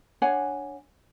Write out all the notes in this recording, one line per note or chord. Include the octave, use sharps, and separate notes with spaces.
D4 C#5 F#5 G#5